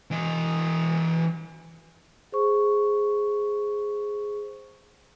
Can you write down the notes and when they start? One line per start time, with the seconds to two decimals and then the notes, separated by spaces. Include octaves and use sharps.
0.11 E3 D#5
2.32 G#4 C5 C#6